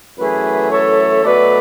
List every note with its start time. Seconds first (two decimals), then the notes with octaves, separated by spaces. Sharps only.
0.18 F#2 E3 A3 G#4 B4
0.71 A4 C#5
1.24 B2 F#3 A3 B4 D5